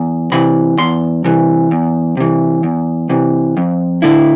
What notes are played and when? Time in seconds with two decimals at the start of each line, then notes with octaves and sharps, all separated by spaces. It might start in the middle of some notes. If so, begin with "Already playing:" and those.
Already playing: E2
0.32 C3 E3 B5
0.77 E2 C6
1.24 C3 E3
1.71 E2
2.17 C3 E3
2.63 E2
3.09 C3 E3
3.57 F2
4.02 D3 A3 E4